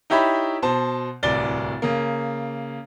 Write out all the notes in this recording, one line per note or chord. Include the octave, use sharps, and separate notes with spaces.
D#4 E4 G4 C#5 E5 B5
B2 C5 A5
D1 C2 D5 A6 G7
C#3 A#3